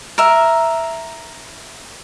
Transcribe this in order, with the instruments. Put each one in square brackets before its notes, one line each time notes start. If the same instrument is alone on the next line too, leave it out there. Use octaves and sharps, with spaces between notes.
[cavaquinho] A#4 E5